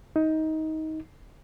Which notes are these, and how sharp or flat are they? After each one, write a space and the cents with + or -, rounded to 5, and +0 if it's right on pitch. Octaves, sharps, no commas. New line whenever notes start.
D#4 +20